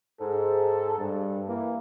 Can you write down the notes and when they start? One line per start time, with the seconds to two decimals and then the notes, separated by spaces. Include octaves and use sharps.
0.20 G#2 A4
0.98 G2
1.48 E3 A#3